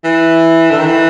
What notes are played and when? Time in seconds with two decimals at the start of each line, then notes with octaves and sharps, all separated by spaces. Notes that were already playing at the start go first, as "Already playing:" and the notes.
0.04 E3
0.71 D3
0.79 D#3
0.85 E3